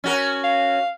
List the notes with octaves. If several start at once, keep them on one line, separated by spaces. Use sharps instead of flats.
C#4 F#4 A#4
F5